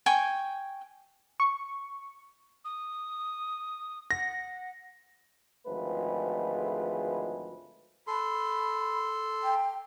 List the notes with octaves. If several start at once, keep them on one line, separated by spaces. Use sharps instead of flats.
G5 G#5 C#6
C#6
D#6
F#5 A#6
G#1 D2 F3 G#3 A3 B4
A4 B5 C6
G5